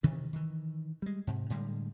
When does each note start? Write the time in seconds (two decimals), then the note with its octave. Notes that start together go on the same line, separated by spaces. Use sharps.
0.03 G2 C3 D#3 E3
0.33 D#3 E3
1.02 G3 G#3
1.27 G#2 C3
1.50 A2 D3 G3 G#3